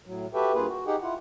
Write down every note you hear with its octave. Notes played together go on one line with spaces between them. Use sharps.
A2 F#3
F#4 G4 A4 B4 E5 G5
G2 A#3 F4 G#4 B4
F#4
D#4 G4 G#4 F#5 G5
E4 F4 F#5